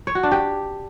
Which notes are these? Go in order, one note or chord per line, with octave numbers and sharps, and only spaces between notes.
C#5
F#4
D4
G4